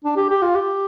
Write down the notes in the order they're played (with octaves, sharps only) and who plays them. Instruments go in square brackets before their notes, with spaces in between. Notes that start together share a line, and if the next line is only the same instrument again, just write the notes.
[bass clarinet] D4
G4
G4
F4
G4